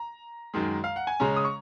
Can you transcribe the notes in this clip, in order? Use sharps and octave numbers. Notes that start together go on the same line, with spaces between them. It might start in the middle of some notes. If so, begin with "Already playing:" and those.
Already playing: A#5
F#2 D#3 G#3
F5
F#5
G#5
C#3 G#3 C#4 A#5
D#6
C#6